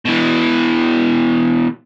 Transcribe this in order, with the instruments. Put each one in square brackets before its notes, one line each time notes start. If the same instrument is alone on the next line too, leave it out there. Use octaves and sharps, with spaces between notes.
[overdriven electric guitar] B2 E3